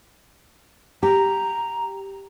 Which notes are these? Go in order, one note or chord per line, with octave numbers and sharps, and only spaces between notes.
G4 A#5